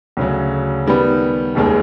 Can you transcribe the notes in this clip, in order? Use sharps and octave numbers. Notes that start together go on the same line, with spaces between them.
D2 C#3 F#3
D#3 G3 B3
F1 D#2 D#3 G#3